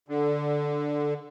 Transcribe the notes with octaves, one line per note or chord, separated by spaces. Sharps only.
D3